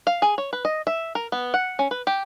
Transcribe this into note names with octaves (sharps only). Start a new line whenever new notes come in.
F5
G#4
C#5
B4
D#5
E5
A#4
B3
F#5
C#4
B4
G4